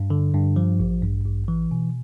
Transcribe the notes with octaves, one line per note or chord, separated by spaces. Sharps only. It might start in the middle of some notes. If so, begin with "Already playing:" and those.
Already playing: G2
D3
G2
F3
A1
G2
A1
E3
B2